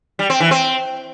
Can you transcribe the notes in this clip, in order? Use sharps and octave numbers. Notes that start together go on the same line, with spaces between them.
G3
C4
E3
C4